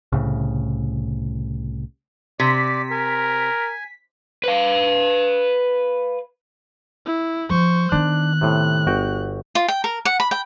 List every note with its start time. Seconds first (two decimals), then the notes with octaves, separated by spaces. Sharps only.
0.12 C2 A2 C#3
2.40 C3 D5 B6
2.91 A#4 G#5
4.44 B4 F5
7.06 E4
7.50 F3 C5 C#6
7.92 D#3 B3 D4 F#6
8.41 A2 C3
8.87 G1 F#4 G5
9.55 F4
9.68 G5
9.84 A#4
10.05 F#5
10.20 B5
10.31 G5